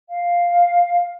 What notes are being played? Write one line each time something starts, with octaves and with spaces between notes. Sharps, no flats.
F5